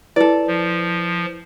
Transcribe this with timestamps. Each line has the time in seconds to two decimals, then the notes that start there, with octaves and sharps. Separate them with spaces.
0.16 E4 A4 B4 D5
0.47 F3